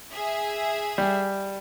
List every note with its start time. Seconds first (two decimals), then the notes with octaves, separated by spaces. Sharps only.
0.14 G#4 E5
0.98 G3